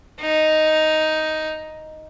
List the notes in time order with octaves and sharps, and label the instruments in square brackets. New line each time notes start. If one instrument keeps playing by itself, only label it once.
[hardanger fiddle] D#4